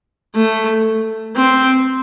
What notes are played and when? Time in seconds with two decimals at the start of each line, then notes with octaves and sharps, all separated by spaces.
0.35 A3
1.37 C4